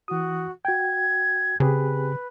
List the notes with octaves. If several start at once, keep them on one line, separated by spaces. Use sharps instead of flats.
E3 F#4 D#6
F#4 G5 G#6
C#3 C4 G4 G#4 B4